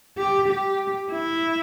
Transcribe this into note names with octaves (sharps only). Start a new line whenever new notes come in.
G4
G4
E4